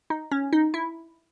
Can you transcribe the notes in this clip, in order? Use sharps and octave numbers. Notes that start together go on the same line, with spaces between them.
D#4
C#4
D#4
E4